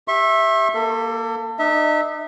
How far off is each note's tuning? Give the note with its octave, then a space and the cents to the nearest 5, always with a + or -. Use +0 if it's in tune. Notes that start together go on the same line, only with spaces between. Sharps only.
G4 +15 E5 +0 C#6 -40
A#3 +0 A4 +30
D#4 -40 E5 -25